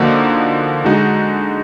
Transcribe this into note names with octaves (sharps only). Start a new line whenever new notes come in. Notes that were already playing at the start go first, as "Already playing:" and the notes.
Already playing: D3 F3 A#3 D#4 F#4
D3 G#3 D#4 F#4